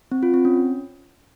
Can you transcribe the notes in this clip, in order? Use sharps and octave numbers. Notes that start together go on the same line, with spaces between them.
C4
F4
C4
C#4